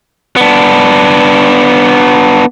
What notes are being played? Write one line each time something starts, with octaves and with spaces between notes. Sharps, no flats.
B3 D4